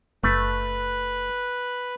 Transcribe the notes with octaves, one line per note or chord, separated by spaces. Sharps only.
F#1 A3 B4 F#6